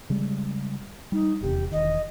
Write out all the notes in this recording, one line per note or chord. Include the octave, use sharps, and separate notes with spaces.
C#3 G3 G#3
G3 D#4
D#1 E2 C3 G4
E1 D#3 D#5